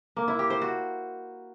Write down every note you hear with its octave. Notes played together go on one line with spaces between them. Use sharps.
A#3
E4
G4
C5
F#4